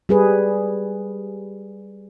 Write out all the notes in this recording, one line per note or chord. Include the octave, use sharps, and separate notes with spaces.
G3 G#4 B4